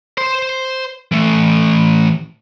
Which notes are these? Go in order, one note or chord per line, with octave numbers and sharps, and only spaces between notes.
C5 C6
E3 A3